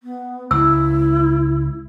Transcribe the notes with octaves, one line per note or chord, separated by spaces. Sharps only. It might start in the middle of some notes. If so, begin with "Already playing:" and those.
B3
C#2 E4 E6